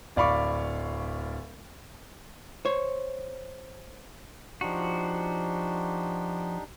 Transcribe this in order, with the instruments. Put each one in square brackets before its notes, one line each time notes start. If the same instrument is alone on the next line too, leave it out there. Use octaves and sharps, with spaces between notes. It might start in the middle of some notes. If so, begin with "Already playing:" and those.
[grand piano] D1 D5 F5 B5 C#6 D6
[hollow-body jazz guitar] C5 C#5
[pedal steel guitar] F3 F#4 [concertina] D4 D#4 G4